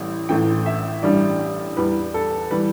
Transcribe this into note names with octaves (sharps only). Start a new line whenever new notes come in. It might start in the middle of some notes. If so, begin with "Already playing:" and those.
Already playing: A1 A2 E3 G3
A1 A2 E3 G5
E5
A1 G2 G3 D5
E2 E3 G3 B4
A4
E3 G3 B4